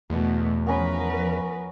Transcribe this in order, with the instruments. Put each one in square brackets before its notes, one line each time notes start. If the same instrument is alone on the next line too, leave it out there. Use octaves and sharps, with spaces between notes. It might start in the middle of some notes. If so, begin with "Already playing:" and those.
[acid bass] E2 [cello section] B2 A3 B3
[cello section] F3 A#4 B4 [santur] B3 C#4 C#6